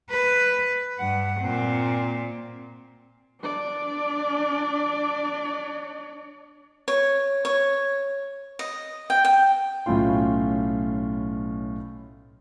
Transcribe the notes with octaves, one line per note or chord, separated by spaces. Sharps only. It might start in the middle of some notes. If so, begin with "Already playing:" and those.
B4
G2 F#5
A#2 C4
D4 D5
C#5
C#5
D#5
G5
G5
B1 A2 C#4 F4 C6